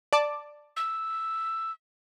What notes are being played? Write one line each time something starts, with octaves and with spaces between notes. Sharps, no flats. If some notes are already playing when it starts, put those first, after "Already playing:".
D5 A5 D6
E6